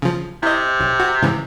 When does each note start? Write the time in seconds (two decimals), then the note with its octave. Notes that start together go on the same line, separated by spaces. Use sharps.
0.02 C#3 F3
0.43 C3 E4 D#5
0.80 B1
1.00 F#4
1.22 G#2 C#3 E3